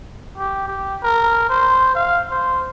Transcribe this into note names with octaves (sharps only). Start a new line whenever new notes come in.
G4
G4
A#4
C5
F5
C5